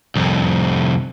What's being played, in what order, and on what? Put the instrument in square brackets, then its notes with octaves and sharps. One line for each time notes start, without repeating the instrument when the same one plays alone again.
[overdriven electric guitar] C2 F2